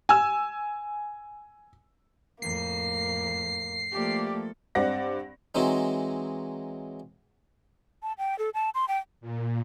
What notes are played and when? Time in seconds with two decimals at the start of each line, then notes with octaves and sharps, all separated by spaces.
0.09 G#5 E6
2.42 F2 A2 A#3 C7
3.93 F3 A3 A#3 G4 A4 D5
4.75 G2 C4 D5 F#5 A#6
5.55 E3 F#3 G#3 C4 D#4
8.03 A5
8.18 G5
8.39 A4
8.54 A5
8.75 C6
8.88 G5
9.21 A#2